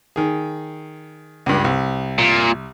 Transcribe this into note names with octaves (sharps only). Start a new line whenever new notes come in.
D#3 G#4
C#2 G2
C2
A#2